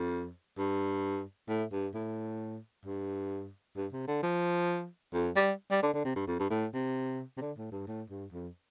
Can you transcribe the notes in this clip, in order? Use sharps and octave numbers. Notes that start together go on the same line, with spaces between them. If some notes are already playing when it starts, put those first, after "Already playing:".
Already playing: F2
G2
A2
G2
A2
G2
G2
C3
D3
F3
F2
G3
G3
D3
D3
C3
G2
F2
G2
A2
C3
C3
D3
A2
G2
A2
G2
F2